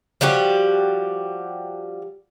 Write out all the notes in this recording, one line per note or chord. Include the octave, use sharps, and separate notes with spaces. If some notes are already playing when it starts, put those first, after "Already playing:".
F3 G3 F#4 G4